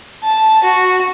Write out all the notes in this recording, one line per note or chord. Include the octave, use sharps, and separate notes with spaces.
A5
F#4